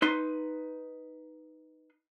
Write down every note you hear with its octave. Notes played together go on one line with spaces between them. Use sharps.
D#4 B4 C6